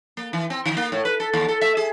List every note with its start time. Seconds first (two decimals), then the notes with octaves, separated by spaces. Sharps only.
0.17 A#3
0.33 E3
0.50 C4
0.66 D#3
0.77 A#3
0.92 A2
1.05 B4
1.20 A4
1.34 D#2
1.49 A4
1.61 E5
1.77 G#4